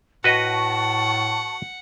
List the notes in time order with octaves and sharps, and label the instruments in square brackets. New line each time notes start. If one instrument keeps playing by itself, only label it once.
[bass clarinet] A2 [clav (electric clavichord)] F#4 B4 D#5 [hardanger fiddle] F#5 [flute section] A5 C#6